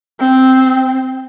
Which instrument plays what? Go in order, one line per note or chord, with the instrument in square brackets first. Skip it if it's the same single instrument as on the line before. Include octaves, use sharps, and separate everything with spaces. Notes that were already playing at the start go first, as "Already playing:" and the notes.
[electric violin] C4